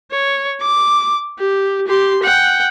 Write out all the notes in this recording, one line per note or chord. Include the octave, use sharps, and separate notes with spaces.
C#5
D6
G4
G4 C6
F#5 G5